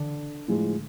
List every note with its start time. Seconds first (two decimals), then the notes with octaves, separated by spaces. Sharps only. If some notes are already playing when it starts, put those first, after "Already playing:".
Already playing: D3
0.48 A2 F3 G#3